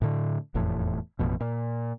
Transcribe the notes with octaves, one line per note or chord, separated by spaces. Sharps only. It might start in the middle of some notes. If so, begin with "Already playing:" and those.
A2 D3
F1 E2 A2
A1 F2 B2
A#2